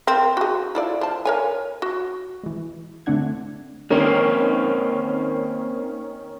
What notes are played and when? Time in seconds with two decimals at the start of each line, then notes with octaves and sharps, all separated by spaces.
0.07 C4 A#4
0.37 F#4 G#4
0.75 E4 F4 D5
1.01 F3 A5
1.25 A#4 C#5 G#5
1.82 F#4
2.44 E3 G#3
3.06 D3 A3 C4 D4 F#5 G#6
3.91 D#3 A#3 C4 C#4